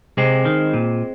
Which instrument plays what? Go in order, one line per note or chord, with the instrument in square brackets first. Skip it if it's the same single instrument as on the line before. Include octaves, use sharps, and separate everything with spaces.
[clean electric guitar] C3 G#3 C4
D#3
A#2